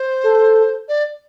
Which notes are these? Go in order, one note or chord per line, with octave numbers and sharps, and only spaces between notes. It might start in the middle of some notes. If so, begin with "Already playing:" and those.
Already playing: C5
A4
D5